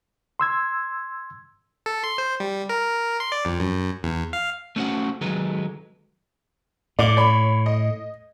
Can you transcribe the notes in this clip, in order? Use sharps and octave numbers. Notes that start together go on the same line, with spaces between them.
C6 E6 G#6
A4
C6
C5
G3
A#4
C6
D5
F2
F#2
E2
F5
A3 C#4 F#4 C5 F#5
D#3 F#3 G#3 A4 B4
A2 D5 D6
C#5 B5
D#5